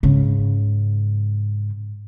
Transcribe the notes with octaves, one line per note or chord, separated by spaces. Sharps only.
G#2 C#3